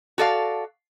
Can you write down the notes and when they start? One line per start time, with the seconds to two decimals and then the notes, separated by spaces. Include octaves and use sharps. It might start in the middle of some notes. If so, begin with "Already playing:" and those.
0.18 F#4 A4 D5 F5